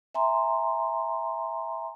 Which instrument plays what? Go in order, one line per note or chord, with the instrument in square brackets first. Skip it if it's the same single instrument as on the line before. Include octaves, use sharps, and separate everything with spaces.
[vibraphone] E5 G#5 A#5 C6